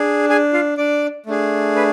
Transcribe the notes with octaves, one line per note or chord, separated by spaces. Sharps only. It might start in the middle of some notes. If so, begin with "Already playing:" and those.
Already playing: D4 G#4
G#4 G#5
F4 F5
D4 D5
A3 D4 G#4
B4